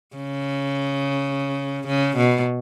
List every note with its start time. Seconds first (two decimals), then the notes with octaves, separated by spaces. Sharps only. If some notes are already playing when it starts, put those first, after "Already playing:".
0.16 C#3
1.87 C#3
2.17 B2